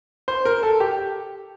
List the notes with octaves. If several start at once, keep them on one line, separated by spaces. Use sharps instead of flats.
C5
A#4
A4
G4